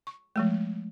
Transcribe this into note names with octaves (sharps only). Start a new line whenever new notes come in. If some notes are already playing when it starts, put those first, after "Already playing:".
C#6
F3 G#3 A3